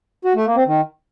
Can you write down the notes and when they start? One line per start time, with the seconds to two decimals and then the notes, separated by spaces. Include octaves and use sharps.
0.25 F#4
0.35 A3
0.46 A#3
0.56 C4
0.66 D#3